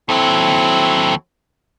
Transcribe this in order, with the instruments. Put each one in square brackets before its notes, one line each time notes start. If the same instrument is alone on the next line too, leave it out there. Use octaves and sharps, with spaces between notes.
[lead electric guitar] D#2 F#3 [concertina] C4 E4 A4